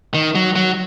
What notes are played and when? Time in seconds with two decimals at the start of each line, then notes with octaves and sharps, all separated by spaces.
0.14 D#3
0.35 F#3
0.56 F#3